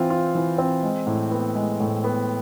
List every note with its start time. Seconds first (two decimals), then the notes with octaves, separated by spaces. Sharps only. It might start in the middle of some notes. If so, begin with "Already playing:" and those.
Already playing: E3 C4 F4
0.10 F4
0.35 E3
0.58 C4
0.83 G#3
1.07 A2
1.31 B3
1.55 G#3
1.80 A2
2.04 B3